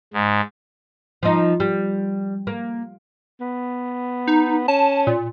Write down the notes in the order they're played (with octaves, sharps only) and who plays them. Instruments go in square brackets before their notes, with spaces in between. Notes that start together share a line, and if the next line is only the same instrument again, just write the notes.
[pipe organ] G#2
[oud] F3 D#4
G3
A#3
[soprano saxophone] B3
[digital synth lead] D#4
[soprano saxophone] C#4 [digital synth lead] A5
[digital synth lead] A#2